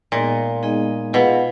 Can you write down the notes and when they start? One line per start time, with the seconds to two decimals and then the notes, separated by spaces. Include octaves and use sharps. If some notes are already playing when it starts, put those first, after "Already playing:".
0.12 A#2 G#3 B3 D#4 G#4 D#5
0.63 G#3 B3 D#4 G#4 D#5
1.13 B2 F4 G#4 B4 F5